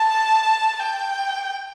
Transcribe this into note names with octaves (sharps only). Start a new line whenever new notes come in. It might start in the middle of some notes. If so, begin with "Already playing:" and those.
Already playing: A5
G5